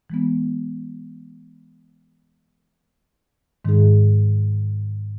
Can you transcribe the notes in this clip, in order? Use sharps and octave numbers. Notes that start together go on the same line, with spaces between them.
E3 G#3 B3
G#2 D#3 G#3 D#4 G#4